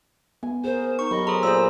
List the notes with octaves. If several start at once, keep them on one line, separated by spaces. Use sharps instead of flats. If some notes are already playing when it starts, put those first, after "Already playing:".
B3 G#5
G#4 A#4 C5
D#4 C#6
F#3 G4 A#4 D#5 B5
G#4 A4 C5 A#5
A#2 G#4 C5 E6